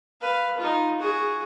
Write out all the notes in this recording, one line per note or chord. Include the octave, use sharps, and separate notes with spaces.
B4 F5
D#4 F4
F#4 G#4